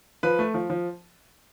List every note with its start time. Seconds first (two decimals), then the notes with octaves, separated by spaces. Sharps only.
0.23 F3 B4
0.39 A3
0.54 F3
0.70 F3